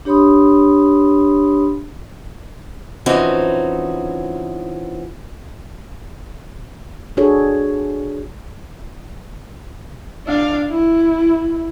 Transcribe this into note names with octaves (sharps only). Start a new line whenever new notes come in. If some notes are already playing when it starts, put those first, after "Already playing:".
D4 G4 C#5 B5 C6 D#6
E3 F3 C4 C#4 D#4 F#4
D4 F#4 G#4 A4 C#5
D4 F5
E4